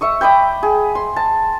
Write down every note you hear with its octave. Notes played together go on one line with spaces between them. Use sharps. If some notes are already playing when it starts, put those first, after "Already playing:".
E5 C#6 D#6
G5 B5 D6 D#6
G#4
C6
A5